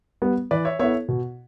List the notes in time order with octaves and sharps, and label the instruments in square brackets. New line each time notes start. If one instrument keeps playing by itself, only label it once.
[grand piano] G3 B3
[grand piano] E3 [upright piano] B4 D5
[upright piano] C#5 E5
[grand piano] B3 E4 A4 [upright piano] C#5 E5
[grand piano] B2